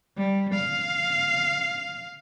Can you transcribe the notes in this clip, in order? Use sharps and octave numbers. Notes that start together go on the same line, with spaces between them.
G3
F5